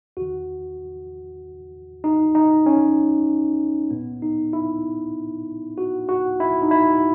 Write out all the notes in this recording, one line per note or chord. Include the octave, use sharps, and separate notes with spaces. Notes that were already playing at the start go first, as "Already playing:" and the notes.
E2 D#3 F#4
D#4
D#4
C#4
A#2 B3
D#4
E4
F#4
F#4
E4
D#4
E4